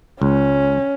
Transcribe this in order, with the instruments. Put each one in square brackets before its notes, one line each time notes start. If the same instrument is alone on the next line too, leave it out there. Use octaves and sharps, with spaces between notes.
[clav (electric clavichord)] C#2 [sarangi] C#4